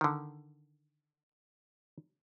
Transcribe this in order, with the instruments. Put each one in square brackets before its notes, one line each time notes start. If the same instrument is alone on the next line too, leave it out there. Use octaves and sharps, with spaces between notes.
[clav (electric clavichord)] D3 D#3